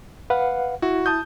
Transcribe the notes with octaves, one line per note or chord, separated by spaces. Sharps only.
B4 F5 F#5
E4 F#4
A5 D#6 G6